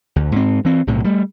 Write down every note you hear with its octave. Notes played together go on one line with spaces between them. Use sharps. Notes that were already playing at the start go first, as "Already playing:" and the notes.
D2
G#2 C4
E3 C4
B1 A2 C3
G3 A3